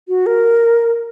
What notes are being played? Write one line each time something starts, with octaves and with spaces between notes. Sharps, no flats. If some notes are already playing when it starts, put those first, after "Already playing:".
F#4
A#4